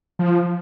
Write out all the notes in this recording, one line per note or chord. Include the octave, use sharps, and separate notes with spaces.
F3